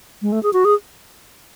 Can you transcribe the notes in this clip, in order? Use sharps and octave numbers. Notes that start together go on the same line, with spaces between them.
G#3
A3
G#4
F#4
G#4